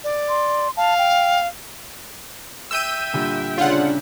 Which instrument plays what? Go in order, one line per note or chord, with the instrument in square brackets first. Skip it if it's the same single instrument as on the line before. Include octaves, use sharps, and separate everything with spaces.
[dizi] D5
[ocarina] C6
[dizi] F5 [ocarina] A5
[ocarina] G5
[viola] E5 G5 [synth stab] E6 G6 D#7
[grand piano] A#2 D3 G3
[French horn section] C#3 C#4 D4 [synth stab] F4 F#5